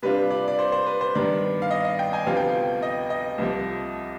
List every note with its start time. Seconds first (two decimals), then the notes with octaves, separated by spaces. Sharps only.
0.02 C3 G3 D4 F4 B4
0.31 D5
0.48 D5
0.59 C5
0.72 C5
0.86 B4
1.01 C5
1.14 G2 D#3 B3 D5
1.62 F5
1.71 D#5
1.85 D#5
1.99 G5
2.13 G#5
2.26 D2 C3 F3 B3 F5
2.37 G5
2.48 F5
2.82 D#5
3.10 D#5
3.38 C2 C3 F3